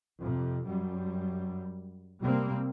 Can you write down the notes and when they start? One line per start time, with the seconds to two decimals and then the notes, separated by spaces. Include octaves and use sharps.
0.19 F2 C3
0.66 F#2 G3
2.20 C3 G3 A#3 C4